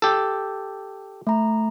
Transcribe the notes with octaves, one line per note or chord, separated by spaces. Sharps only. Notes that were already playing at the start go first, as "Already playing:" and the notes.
G4 A4
A3 A#5